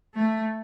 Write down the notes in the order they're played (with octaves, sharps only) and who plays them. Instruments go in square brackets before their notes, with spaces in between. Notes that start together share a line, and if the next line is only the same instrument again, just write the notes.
[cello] A3